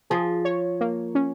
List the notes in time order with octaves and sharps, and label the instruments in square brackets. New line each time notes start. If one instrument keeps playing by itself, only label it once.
[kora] F3 [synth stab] G#4
[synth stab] C#5
A#3
C#4